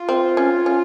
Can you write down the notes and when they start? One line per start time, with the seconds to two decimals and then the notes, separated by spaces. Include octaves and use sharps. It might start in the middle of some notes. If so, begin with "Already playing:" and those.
Already playing: F4
0.09 C4
0.37 C#4
0.66 C#4